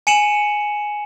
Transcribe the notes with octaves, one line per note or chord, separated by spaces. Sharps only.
G#5 C#7 D#7 E7 F#7